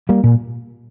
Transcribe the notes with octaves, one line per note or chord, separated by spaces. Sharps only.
G3 A#3
A#2